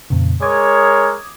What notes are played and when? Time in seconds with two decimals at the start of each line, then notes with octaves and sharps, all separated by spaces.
0.10 F2 A#2 C#3
0.42 G#3 A#4 C#5 D6 D#6 G#6